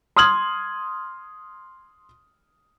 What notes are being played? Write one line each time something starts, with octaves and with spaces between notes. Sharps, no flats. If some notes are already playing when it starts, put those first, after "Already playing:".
C6 D#6 F6 G#6 F#7